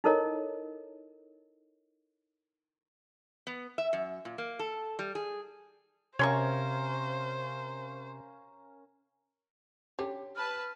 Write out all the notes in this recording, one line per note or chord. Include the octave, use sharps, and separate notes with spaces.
D#4 E4 A4 A#4 C#5 D#5
B3
E5
F#2
A#2
A#3
A4
G3
G#4
C3 C#4 A#4 C5 C#5 F5 C6 C#6
D3 C#4 G4
B4 A5 F6